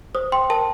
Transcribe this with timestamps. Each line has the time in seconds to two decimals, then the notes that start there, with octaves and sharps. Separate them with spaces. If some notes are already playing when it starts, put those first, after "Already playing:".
0.15 C5 D#6
0.32 G5 C6
0.50 A#4 A5